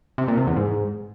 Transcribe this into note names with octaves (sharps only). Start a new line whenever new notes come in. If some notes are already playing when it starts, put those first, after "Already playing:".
C3
A#2
C3
E2
G#2